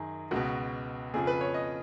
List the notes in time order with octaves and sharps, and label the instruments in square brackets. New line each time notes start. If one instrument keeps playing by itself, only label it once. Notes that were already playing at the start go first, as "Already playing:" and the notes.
Already playing: [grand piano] F#2 D#3 G#4
C#2 B2 F#4
F2 C#3 F3 G#4
B4
C#5
D#5